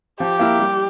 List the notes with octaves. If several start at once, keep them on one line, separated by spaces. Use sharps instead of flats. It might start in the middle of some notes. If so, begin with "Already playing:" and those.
F3 G4
A#3 E4 A#4
G3